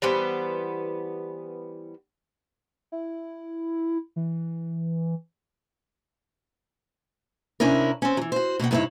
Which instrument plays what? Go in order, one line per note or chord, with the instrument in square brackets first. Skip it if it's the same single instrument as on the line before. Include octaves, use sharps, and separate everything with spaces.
[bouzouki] E3 G3 B3 C5
[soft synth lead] E4
E3
[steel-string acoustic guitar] C3 C#4 D4 E4 A#4
C4 C#4
E3 F#3
F#4 C5
B2 A#3 F#5 G5
G2 C3 B3 D#4 E4 C#5